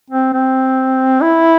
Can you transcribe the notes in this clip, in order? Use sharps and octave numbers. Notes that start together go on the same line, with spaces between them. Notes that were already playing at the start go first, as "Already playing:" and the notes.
C4
C4
E4